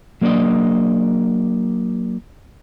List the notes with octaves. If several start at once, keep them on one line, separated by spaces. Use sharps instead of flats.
F#3 A#3 D4 D5 D#5